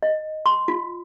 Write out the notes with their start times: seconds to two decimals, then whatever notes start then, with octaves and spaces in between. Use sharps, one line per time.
0.03 D#5
0.46 C6
0.68 F4